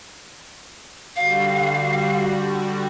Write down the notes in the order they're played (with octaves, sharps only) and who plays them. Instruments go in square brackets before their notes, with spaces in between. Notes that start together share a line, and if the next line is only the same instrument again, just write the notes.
[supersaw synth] D3 G3 F#4 [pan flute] F5